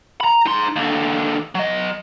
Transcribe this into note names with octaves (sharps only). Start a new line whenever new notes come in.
A#5 B5
D#4 C6
D#2 D3
F#3 D#5